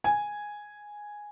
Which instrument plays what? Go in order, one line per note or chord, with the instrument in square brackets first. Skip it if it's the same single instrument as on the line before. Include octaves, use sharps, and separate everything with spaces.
[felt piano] G#5